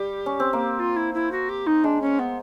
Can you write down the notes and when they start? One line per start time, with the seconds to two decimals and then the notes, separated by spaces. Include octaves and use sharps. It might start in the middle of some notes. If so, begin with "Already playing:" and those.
Already playing: G3 G4
0.26 C#4
0.40 C4
0.53 A#3
0.79 F4
0.96 E4
1.14 E4
1.31 F#4
1.49 G4
1.66 D#4
1.84 G#3 D4
2.01 C#4
2.19 B3